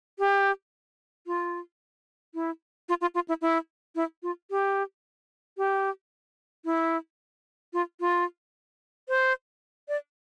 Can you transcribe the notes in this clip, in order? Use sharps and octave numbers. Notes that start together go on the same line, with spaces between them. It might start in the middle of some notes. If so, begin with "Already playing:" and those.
G4
F4
E4
F4
F4
F4
E4
E4
E4
F4
G4
G4
E4
F4
F4
C5
D5